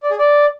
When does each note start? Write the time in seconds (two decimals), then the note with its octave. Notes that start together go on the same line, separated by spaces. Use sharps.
0.03 D5
0.10 G#4
0.18 D5